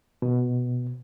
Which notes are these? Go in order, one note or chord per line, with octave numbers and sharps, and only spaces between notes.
B2